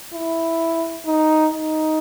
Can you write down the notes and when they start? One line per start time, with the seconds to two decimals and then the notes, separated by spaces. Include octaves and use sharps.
0.14 E4
1.06 D#4
1.53 D#4